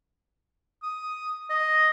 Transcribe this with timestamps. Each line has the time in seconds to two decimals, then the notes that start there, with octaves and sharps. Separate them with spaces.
0.83 D#6
1.50 D#5